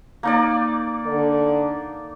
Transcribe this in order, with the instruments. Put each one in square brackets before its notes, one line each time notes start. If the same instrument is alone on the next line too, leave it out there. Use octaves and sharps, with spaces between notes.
[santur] A#3 D#4 D5
[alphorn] D3